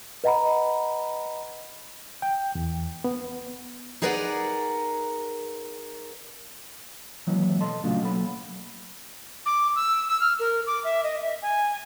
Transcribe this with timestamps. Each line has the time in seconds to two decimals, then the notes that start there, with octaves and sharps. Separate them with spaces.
0.24 B4 D#5 F#5 A#5 B5
2.22 G5
2.55 E2
3.04 B3
4.02 D#4 G#4 A#4 B4 D5 F#5
7.27 D#3 E3 F#3 G#3 A#3 E4
7.60 B2 A4 D#5 A5 C6
7.84 A#2 C#3 F#3 A3 D4 F4
8.01 B2 F#3 A#3 A4 C#5 B5
9.46 D6
9.76 E6
10.08 E6
10.21 F6
10.39 A#4
10.67 D6
10.84 E5
11.04 D#5
11.21 E5
11.42 G#5